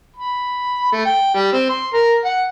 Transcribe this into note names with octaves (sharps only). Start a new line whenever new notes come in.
B5
A3
G5
G3
C4
C6
A#4
F#5